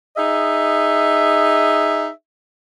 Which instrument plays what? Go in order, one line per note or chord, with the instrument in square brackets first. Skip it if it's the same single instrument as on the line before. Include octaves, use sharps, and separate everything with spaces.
[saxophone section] D#4 G#4 D#5 E5